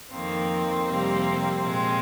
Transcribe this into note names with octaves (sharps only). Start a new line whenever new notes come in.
F2 D#3 A#3 C4
F2 C3 G3 A#3
A#2 F3 G#3